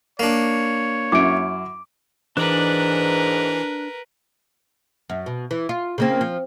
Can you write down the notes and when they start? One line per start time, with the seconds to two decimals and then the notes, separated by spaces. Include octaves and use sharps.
0.19 A#3 D4 C#5
1.12 F#2 E4 D6 D7
2.37 G#2 E3 D4 A#4 B4 D5
5.10 F#2
5.26 B2
5.51 E3
5.69 F4
5.98 C#3 A#3 C4
6.21 F3